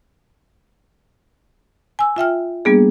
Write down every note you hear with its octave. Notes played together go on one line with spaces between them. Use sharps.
G#5 E6
F4 E5 G5 F6
G3 A#3 B3 D4 G#4